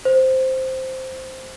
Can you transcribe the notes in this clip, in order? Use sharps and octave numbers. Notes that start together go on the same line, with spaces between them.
C5